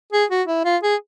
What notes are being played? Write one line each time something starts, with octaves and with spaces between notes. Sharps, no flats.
G#4
F#4
E4
F4
G#4